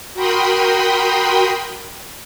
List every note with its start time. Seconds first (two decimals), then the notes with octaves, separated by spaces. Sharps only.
0.14 F#4 A#4 G5 B5 C6 D#6